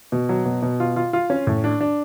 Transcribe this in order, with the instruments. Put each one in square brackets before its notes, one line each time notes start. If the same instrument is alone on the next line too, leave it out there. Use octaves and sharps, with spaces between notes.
[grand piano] B2
F#3
B2
B2
F4
F4
F4
C#4
A2
D4
D4